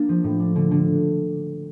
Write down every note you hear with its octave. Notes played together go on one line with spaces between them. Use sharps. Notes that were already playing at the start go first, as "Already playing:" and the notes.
Already playing: A#3 D4
F3
A2
D4
D3
D3